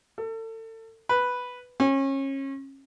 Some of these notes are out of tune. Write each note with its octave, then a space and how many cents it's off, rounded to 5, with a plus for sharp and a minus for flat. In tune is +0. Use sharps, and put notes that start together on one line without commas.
A4 +35
B4 +0
C#4 -30